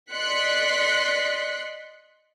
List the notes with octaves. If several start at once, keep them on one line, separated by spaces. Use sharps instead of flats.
D5 D#5 C6 F#6 B6 C#7